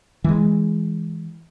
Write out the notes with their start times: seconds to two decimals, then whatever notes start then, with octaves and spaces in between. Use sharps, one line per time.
0.24 E3 G#3